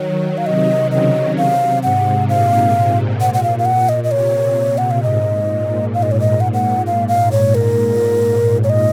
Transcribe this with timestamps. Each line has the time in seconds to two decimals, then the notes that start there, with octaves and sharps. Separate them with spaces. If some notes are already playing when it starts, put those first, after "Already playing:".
Already playing: D#3 F#3 C#5
0.37 F5
0.45 C3 D#3 D#5
0.91 C#3 D#5
1.37 C3 F5
1.83 G#2 F#5
2.29 A#2 F5
3.21 F#5
3.34 F#5
3.43 F5
3.59 F5
3.65 F#5
3.89 D#5
4.04 D#5
4.11 C3 C#5
4.57 A#2
4.78 F#5
4.91 F5
5.02 G#2 D#5
5.49 A#2
5.94 G#2 F5
6.02 D#5
6.11 C#5
6.20 D#5
6.40 G#2 F#5
6.54 F#5
6.86 F5
7.08 F5
7.31 C#5
7.55 A#4
8.64 C#5
8.69 D#5